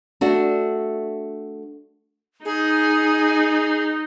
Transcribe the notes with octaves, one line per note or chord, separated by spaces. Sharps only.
A3 D4 F#4
D#4 G#4